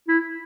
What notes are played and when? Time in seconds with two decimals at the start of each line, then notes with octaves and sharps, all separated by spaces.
0.08 E4